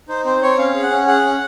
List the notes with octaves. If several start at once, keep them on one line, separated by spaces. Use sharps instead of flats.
D#4 C5
C4 C5
C4 C#5
C#4 F5
G#4
F#5
C#4
G#4 F#5
C#4